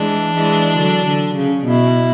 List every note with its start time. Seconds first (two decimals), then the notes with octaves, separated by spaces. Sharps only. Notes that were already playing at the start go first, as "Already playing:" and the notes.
Already playing: E3 G#3 D4
0.35 E3 G#3
0.77 D3 F#3
1.06 D3
1.36 C#3
1.65 B2 E4